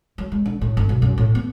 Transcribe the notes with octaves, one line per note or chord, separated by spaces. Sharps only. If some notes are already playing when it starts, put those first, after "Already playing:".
F#3
G#3
D3
A2
G1
B1
F#2
A2
B3